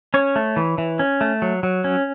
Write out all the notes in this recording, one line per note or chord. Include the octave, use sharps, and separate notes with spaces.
C#4 C#5
A3
E3
E3
C#4
A3
F#3
F#3
C#4